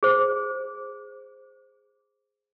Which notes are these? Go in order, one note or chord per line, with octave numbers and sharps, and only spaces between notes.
G#4 C5